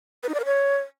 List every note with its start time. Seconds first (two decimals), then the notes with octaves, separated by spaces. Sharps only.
0.23 B4
0.29 D#4
0.34 D5
0.40 A#4
0.45 C#5